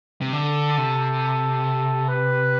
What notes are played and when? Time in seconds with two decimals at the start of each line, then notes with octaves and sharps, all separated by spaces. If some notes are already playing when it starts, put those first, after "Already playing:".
0.21 C3
0.33 D3 A4
0.78 C3
2.09 B4